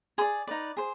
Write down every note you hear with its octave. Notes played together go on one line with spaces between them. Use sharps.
G#4 D5 C6
D#4 B4 D5
G#4 C5